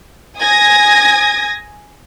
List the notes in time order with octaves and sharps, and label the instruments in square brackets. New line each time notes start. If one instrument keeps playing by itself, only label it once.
[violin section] G#5 D#6 G#6 A#6